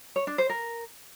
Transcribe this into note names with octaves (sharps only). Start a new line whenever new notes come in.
C#5
D4
C5
A#4